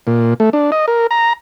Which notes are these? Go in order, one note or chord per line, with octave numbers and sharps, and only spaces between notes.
A#2
A3
D4
D#5
A#4
A#5